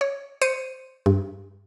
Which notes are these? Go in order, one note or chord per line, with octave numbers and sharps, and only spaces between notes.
C#5
C5 C#7 D#7
G2